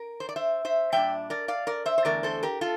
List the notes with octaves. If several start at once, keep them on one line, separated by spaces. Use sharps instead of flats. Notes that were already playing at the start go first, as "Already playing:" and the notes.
Already playing: A#4
C5
D5
C5 E5
C5 E5
A#2 G3 D4 E5 G5
A#4 D5
D5 F5
A#4 D5
C5 E5
C5
E2 D3 A3 A#4 D5
A4 C5
G4 A#4
F4 A4